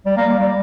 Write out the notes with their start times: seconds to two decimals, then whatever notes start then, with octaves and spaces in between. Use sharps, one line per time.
0.06 G3
0.17 A#3
0.29 G3
0.39 G3